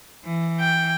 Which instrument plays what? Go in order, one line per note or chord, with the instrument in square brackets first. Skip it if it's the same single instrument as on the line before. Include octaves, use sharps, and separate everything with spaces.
[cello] E3
[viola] G5